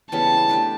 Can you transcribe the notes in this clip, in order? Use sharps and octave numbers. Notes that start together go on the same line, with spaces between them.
C#3 E3 G3 B3 A5
A3 D4 G4